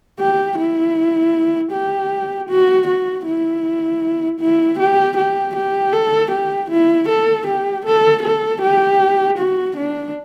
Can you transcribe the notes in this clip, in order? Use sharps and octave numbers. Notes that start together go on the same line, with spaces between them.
G4
E4
G4
F#4
F#4
E4
E4
G4
G4
G4
A4
G4
E4
A4
G4
A4
A4
G4
F#4
D4